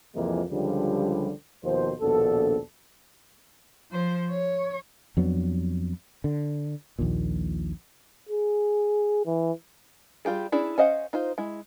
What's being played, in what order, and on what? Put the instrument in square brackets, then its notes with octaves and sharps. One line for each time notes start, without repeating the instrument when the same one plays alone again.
[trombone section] C2 F2 E3 F3 G#3 A#3
C#2 D3 F3 G3
D#2 B2 F3 C5
A#1 D#2 B2 D4 A4
[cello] F3 C5
C#5
[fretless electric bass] F2 F#3 B3 D4
D3
A#1 D#2 A#2
[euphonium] G#4
E3
[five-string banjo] G3 F4 G4 G#4
C#4 D4 E4 G#4
C#4 C5 D#5 F5 F#5
D#4 F4 C5
G#3 E4